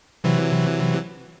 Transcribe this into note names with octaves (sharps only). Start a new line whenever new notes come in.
C3 E3 F#3